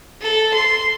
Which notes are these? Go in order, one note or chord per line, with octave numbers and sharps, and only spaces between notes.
A4
C6